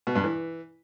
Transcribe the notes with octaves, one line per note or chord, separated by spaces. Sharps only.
B2
G2
E3